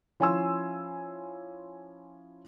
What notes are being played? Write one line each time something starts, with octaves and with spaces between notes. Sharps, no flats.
F3 C#4 E4 G#5 C6 E6